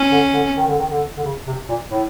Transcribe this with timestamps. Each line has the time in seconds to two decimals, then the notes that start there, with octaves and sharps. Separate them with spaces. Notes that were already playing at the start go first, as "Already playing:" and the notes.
Already playing: C#4
0.12 D3
0.33 D3
0.57 D#3
0.67 D3
0.79 D#3
0.91 D3
1.17 D3
1.24 C#3
1.47 C3
1.69 A#2
1.91 A2